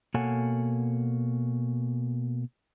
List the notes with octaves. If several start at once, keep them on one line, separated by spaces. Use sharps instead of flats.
B2 A#3 A4 C#5 F#5 G#5